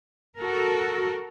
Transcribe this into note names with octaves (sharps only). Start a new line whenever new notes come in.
F#4 A4 A#4